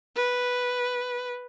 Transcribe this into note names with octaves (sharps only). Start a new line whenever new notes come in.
B4